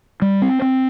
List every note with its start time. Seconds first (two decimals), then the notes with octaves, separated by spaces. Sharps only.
0.22 G3
0.42 C4
0.62 C4